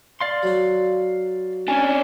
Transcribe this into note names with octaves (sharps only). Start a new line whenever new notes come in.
D5 F5 C6
F#3 F#4
C#4 D4 G#5